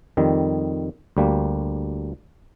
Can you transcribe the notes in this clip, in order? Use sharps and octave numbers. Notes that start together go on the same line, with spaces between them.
F2 D#3 G3
D2 G3 A#3